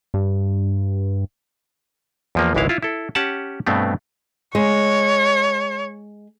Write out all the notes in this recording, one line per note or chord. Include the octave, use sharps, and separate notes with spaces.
G2
E2 F3 A#3
G#1 C#2 E3 G#3 E4 F5
E4 F4
E4 A4
C#4 G4 F#5 A5
G2 B2 A3 B3 C4
G#3 C#5